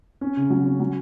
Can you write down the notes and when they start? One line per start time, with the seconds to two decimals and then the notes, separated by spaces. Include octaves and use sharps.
0.21 C#4
0.37 C#3
0.50 F#3
0.65 C#4
0.80 F#3